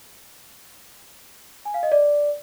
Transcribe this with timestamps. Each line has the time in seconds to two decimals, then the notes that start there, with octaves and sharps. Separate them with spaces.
1.65 G#5
1.74 F5
1.83 D#5
1.92 D5